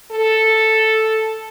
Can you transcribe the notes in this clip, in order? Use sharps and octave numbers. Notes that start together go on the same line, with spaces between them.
A4